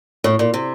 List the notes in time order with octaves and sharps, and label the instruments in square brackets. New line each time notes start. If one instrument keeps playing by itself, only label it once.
[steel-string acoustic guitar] A2
A#2
C3